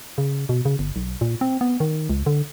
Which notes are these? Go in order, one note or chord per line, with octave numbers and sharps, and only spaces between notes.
C#3
B2
C#3
G1
B1
A#2
C4
B3
D#3
C#2
D3